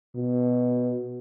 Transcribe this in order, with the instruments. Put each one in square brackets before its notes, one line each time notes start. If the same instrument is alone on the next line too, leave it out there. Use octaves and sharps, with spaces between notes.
[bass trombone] B2